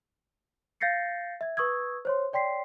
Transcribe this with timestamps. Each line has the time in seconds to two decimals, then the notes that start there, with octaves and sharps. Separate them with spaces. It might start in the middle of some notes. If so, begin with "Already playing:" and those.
0.80 F5 G6 A6 A#6 C7 C#7
1.41 E5 G#6
1.57 B4 C#6 D#6 E6 G#6
2.05 C5 C#5 C6
2.33 C#5 D5 G5 C6 B6 C7